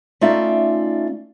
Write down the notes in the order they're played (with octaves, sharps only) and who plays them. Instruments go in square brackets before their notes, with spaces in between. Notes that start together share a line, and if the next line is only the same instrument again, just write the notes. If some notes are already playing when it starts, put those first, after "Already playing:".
[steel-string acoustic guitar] A3 C#4 D#4 F4 D5 E5